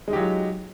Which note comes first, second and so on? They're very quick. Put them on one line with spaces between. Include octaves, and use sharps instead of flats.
G#3 D#4 G4 F#3 F4